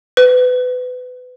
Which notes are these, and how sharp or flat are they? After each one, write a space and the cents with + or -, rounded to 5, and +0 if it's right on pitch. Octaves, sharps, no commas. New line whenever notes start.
B4 +25